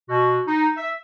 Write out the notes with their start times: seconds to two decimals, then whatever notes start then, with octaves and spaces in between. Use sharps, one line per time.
0.09 B2 F#4
0.47 D#4
0.77 E5